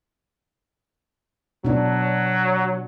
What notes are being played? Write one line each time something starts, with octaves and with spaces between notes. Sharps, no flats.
B2 F#3 D4